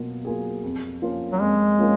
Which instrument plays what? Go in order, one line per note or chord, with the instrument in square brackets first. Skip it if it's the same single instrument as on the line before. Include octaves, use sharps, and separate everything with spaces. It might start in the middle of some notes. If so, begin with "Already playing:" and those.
Already playing: [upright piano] B2 F#3 A#3 F4
F#3 A#3 F4 G#4
F2
F3 A#3 C#4 F4
[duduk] F#3
[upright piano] F2 [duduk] G#3
[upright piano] F3 A#3 C#4 F4